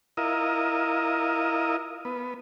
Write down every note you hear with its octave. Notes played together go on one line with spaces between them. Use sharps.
E4 F4 A#4 D#5
B3